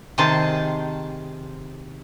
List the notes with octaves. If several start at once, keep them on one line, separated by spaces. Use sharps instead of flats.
C3 D#3 G#4 C5 A5